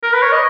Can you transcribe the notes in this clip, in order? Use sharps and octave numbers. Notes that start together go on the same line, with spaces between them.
A#4
B4
C#5
D#5